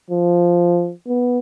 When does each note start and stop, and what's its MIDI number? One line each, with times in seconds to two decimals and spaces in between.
0.10 0.92 53
1.07 1.39 59